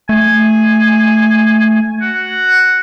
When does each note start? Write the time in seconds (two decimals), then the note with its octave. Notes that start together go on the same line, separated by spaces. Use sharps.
0.09 A3 G#5
2.01 F#4